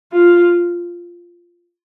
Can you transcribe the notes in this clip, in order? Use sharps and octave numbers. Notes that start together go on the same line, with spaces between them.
F4